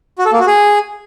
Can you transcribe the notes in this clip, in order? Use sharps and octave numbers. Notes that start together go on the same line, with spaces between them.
F#4
A4
A#3
F#4
G#4